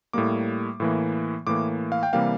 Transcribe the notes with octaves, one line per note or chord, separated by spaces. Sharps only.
A2 G3 A#3 D6
A2 E3 A#3
A2 E3 A#3 D6
F5
G5
C3 E3 G3 A#3 F5